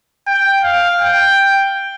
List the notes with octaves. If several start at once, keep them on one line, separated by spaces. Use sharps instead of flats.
G5
F5
G5